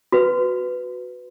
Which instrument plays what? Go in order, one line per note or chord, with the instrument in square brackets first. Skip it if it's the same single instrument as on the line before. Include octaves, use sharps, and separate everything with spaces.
[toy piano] F#4 B4